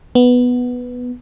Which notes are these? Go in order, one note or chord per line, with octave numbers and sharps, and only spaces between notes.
B3